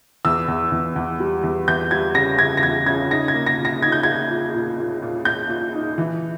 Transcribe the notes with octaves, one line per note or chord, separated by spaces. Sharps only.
E2 E6
E2
E2
E2
G3
E2
E2 G6
G3 G#6
C#3 A#6
C#3 G#6
A#6
E2 G#6
C#3 G#6
D#4 A#6
G#6
A#3
A#6
A#2
A#6
D#4 G#6
G6
A#3 G#6
A#2
A#2
A#2
A#2
A#2 G6
A#2
D#4
E3